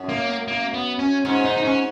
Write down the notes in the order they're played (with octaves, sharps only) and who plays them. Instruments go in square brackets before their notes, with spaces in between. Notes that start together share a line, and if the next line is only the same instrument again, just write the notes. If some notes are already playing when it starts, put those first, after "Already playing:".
Already playing: [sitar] F#2
[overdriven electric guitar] A#3
A#3
B3
C#4
[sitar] G#2 [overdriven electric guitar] C#4
[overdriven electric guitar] D#4
D#4
C#4